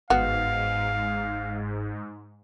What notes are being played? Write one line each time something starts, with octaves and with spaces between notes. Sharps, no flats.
G1 G#2 B3 F#4 F5